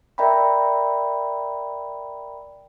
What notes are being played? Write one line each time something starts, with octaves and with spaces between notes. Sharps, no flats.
A#4 D5 E5 G5 A#5 B5